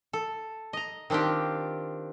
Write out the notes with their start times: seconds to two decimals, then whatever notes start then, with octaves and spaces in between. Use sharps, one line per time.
0.13 A4
0.73 D#5 A#5
1.10 D#3 C4 D4 F4 G4